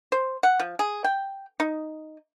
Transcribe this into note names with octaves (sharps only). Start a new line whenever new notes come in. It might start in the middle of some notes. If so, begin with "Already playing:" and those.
C5
F#5
F3
G#4
G5
D#4